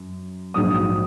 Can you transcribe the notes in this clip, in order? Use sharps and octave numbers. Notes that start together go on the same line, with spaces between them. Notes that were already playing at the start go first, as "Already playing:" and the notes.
Already playing: F#2
A#1 G#2 F#3 A#3 D#6